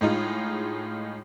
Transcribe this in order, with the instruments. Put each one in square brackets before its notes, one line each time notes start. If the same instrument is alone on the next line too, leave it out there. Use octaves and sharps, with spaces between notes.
[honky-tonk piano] A2 G#3 D#4 F4